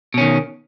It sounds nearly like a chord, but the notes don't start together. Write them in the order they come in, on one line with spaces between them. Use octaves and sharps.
B2 C#4 D#3